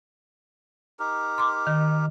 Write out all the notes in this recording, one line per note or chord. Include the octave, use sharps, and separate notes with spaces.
D#4 G4 A#4
C6 D6
D#3